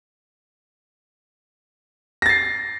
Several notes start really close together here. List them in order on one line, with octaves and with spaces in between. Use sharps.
A#6 A6 C7